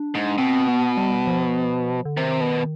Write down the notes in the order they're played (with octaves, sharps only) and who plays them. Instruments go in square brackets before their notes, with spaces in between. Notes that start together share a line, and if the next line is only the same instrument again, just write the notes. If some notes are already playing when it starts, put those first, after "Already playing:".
Already playing: [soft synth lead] D4
[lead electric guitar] G#2
[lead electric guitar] B2 [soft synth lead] C4
[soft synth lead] B3
G3
F3
D3
[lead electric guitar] C3 [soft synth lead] D#3
[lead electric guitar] B2